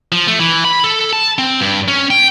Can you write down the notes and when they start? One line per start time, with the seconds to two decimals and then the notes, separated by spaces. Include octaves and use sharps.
0.12 F3
0.27 A3
0.39 E3
0.65 B5
0.84 A4
1.13 A5
1.38 C4
1.61 G2
1.88 C#4
2.10 G5